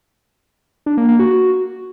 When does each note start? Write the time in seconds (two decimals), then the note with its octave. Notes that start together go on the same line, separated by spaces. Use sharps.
0.86 D4
0.97 A#3
1.08 A#3
1.19 F#4
1.30 F#4